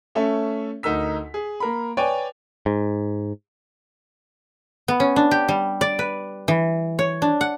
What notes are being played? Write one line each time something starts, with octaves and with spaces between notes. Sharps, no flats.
A3 C#4 A4 E5
D2 D#4 A#4 E6 B6
G#4
A#3 A#4 B5
B4 C#5 D5 G5 G#5
G#2
B3
C#4
D4
G4
G3
D5
B4
E3
C#5
D4
F#5